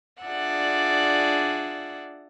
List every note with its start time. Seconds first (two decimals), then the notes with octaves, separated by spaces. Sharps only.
0.24 D4 F4 G#4 D5 E5 F#5